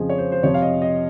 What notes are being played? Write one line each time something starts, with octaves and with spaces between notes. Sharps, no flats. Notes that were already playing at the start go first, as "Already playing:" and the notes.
Already playing: F2 C#3 F3 G#4 D#5
C#5
C5
C5
F2 C3 F3 C#5
F5
D#5
D#5